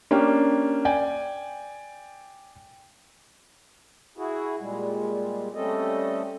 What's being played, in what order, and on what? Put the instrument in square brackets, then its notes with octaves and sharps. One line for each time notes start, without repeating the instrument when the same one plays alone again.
[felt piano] A#3 C#4 D4 G4
D5 G5 G#5
[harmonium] E4 F#4 G#4
A#2 G3 G#3
G3 A3 C4 C#4 A4 D#5